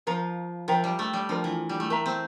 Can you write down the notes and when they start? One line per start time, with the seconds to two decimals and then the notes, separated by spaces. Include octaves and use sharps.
0.07 F3 A#4 F5 A#5
0.68 F3 A#4 E5 G5 A#5
0.84 G3
0.99 A3
1.13 G3
1.29 F3 D4 F4 A#4 D5
1.44 E3
1.69 G3
1.80 A3
1.90 A3 A#4 E5 A#5
2.06 C4